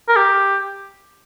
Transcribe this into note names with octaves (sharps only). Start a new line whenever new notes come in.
A#4
G4